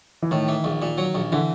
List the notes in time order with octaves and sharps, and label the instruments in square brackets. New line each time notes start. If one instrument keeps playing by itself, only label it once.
[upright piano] E3
[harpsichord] A2 [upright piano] D#3
[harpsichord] E3
A#1
A#2
F#3
A#1
[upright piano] D3 [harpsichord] E3